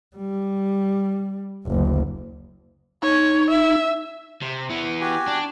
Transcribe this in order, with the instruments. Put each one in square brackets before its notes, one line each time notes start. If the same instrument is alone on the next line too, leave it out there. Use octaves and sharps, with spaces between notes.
[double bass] G3
F#1 D2
[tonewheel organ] D#4 [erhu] C#5
[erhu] E5
[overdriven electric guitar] C3
E3 B3
[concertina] F#4 G4 G#5
[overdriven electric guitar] D4